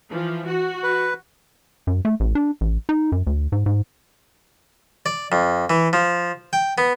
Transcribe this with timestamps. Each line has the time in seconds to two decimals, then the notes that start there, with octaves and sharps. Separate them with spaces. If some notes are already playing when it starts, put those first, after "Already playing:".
0.11 E3 F3
0.45 F#4
0.83 B4
1.87 F#2
2.05 A3
2.20 A1
2.35 D4
2.61 A1
2.89 D#4
3.12 F#2
3.27 D2
3.52 G#2
3.66 G#2
5.06 D5
5.32 F2
5.70 E3
5.93 F3
6.53 G5
6.78 B3